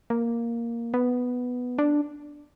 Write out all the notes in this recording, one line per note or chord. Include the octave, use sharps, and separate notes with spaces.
A#3
B3
D4